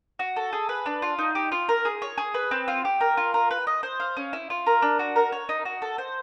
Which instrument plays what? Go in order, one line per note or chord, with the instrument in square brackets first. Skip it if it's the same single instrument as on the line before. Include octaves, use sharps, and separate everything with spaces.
[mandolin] F#4
A4
G#4
B4
D4
F4
D#4
G4
F4
A#4
G#4
C#5
G#4
B4
C4
F4
G4
A#4
F4
A#4
B4
D#5
C5
F5
C#4
E4
F4
A#4
D4
F#4
A#4
C#5
D#4
F#4
A4
C5